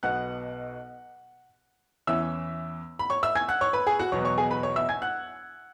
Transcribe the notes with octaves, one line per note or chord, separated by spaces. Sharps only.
B1 B2 B3 F#5 F#6
E2 E3 C#4 E5 E6
B5
C#5 C#6
E5 E6
G#5 G#6
F#5 F#6
C#5 C#6
B4 B5
G#4 G#5
F#4 F#5
E2 B2 F#3 B3 C#5 C#6
C#5 C#6
G#4 G#5
B4 B5
C#5 C#6
E5 E6
G#5 G#6
F#5 F#6